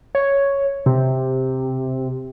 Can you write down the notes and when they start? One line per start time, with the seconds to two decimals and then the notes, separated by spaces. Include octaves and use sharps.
0.15 C#5
0.86 C3